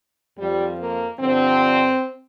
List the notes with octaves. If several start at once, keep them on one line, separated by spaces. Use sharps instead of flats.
F2 F3 G3
A#3
G2 D3 F3 C4